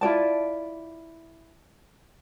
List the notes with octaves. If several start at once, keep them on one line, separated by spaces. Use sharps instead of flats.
E4 F4 D5 A5